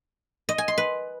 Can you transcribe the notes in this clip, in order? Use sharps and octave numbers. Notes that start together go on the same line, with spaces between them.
D#5
G#5
C6
B4